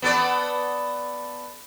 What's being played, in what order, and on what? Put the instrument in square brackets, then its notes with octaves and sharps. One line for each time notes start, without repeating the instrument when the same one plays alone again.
[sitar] B3 A4 D5